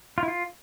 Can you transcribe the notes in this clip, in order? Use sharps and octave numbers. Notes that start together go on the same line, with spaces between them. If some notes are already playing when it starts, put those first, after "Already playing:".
F4
E4
F4